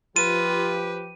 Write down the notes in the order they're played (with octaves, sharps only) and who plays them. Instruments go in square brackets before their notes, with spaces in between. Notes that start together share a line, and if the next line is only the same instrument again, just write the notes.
[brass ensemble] F3 G4 [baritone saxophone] F4 [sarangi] B4 [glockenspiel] D#7